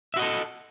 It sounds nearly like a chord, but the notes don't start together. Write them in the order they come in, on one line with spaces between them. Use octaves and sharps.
E5 F#4 D#5 A4